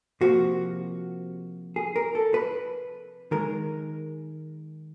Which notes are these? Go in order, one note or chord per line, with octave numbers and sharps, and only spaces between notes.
C3 F3 A#3 F#4
G#4
A#4
A4
B4
D#3 G#3 A#4